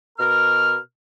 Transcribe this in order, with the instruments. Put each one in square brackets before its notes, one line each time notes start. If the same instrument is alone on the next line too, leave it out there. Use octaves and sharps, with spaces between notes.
[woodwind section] B2 A#4 F6